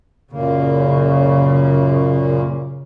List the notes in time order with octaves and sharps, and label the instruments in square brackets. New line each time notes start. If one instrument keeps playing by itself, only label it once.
[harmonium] F#2 A#2 A#3 [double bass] C#3